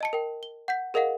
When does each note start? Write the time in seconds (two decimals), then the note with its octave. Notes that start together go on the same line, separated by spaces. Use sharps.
0.01 D#5 A5 C#7
0.13 A#4 G5
0.43 G7
0.68 F#5 G6 B6
0.94 G#4 A#4 D#5 F5 F#5